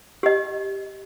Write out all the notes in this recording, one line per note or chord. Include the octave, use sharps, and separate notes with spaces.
G4 D#5